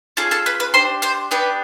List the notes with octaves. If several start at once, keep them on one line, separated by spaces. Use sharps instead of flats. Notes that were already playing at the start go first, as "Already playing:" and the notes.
C#4 F4 G#4 A4 A5
A4 A5
B4 B5
B4 B5
D4 G4 C5 C6
C5 C6
B3 D4 G4 B4 B5